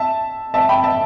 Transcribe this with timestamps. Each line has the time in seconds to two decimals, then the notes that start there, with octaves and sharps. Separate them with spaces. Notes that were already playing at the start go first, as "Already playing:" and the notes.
Already playing: E5 A5
0.54 E5 A5
0.69 G5 B5
0.83 E5 A5